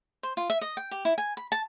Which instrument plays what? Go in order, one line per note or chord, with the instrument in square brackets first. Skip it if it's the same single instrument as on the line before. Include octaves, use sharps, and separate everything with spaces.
[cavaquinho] C5
F4
E5
D#5
G5
G4
E4
G#5
B5
A5